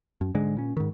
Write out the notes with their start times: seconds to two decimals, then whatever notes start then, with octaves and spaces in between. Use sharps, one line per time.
0.21 F#2
0.35 G#2 D3 G#3
0.57 A#2 C#4
0.77 G#2 D#3